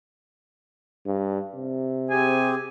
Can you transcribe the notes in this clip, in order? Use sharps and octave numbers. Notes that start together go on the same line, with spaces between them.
G2
C3
C4 G4 G#4 G#5